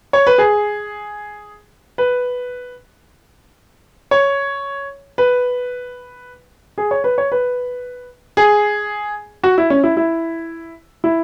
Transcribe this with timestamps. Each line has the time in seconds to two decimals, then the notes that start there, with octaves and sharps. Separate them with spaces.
0.13 C#5
0.27 B4
0.38 G#4
1.98 B4
4.11 C#5
5.18 B4
6.78 G#4
6.91 C#5
7.04 B4
7.18 C#5
7.32 B4
8.37 G#4
9.44 F#4
9.58 E4
9.70 C#4
9.83 E4
9.97 E4
11.04 E4